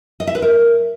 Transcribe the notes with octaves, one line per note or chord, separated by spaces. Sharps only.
D#5
E5
B4
A#4